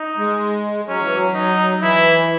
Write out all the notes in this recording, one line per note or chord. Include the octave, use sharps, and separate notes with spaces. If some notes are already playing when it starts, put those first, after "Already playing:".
Already playing: D#4
G#3
F#3 C#4
E3
F#3
D#4
E3 E4